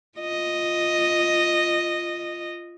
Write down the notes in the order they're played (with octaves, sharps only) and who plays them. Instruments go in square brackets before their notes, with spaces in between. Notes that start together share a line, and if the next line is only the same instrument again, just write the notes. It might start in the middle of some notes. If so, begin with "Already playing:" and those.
[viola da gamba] F4 D#5